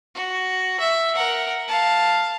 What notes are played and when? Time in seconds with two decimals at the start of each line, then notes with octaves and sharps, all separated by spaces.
0.15 F#4
0.80 E5
1.15 A#4 F#5
1.68 F5 A5